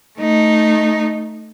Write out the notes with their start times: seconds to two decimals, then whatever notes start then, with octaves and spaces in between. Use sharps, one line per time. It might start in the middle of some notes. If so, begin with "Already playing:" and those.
0.18 A3 D#4